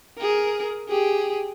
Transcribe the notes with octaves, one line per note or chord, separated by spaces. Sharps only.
G#4 A#4
G4 G#4